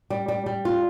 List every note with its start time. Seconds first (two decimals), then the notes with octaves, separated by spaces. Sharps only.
0.10 G3
0.28 G3
0.46 G3
0.65 F4